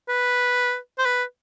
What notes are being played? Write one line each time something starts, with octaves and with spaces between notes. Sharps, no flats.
B4
C5
B4